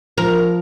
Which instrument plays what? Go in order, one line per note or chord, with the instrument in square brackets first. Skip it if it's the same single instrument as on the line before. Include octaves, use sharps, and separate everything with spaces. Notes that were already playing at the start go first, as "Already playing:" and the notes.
[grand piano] F3 [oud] A#4